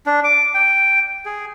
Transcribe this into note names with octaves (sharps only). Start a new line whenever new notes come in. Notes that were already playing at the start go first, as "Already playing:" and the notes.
D4
D6
G5
G#4